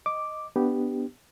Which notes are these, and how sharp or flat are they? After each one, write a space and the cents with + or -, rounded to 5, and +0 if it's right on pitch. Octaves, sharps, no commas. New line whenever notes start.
D#5 +0 D6 +0
B3 +0 D4 +0 G4 -5